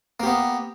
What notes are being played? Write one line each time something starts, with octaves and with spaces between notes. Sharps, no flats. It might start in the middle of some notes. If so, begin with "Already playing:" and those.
A#3 B3 G4